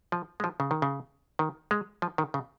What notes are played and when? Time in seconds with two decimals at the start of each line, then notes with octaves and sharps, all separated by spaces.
0.12 F3
0.40 G#3
0.44 F3
0.60 C#3
0.71 D#3
0.82 C#3
1.39 D#3
1.71 G#3
2.02 F3
2.18 D#3
2.34 C#3